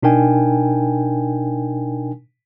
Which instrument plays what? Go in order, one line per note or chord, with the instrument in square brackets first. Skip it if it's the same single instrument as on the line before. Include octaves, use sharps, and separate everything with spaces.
[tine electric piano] B2 D4 D#4 A#4 G5 G#5